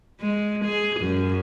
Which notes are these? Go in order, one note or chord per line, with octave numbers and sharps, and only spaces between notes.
G#3
G#4
F#2